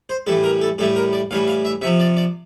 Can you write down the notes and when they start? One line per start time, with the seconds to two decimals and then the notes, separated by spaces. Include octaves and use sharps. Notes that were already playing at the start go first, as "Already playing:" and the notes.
0.09 C5
0.27 A2 E3 G3 A4
0.44 A#4
0.61 A4
0.78 A2 E3 G3 A4
0.96 A#4
1.13 D5
1.31 A2 E3 G3 F5
1.47 F5
1.65 E5
1.81 C3 E5
1.85 F3
2.00 D5
2.17 D5